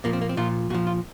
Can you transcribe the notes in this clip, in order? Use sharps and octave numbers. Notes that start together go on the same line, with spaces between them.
A#2 F3 A#3
C4
A#3
C4
A#2 F3 F4
A#2 F3 F#4
F4